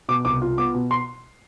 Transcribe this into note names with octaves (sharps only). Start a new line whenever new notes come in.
B2 D6
C2 D6
F4
B3 D6
B2
C6